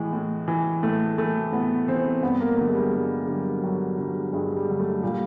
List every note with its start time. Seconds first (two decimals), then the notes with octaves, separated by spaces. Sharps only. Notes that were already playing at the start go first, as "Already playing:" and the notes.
Already playing: A2 E3 G#3
0.13 A2
0.48 E3
0.83 A2 A3
1.18 E3 A3
1.52 A2 B3
1.88 E3 C4
2.23 G2 B3
2.40 A#3
2.57 D3 F#3 A3
2.67 G#3
2.75 G3
2.93 G2 G3
3.27 D3 F#3 G3
3.63 G2 F#3
3.98 D3 F#3 G3
4.33 G2 G#3
4.57 G3
4.68 D3 F#3
4.80 A3
5.03 A#2 G3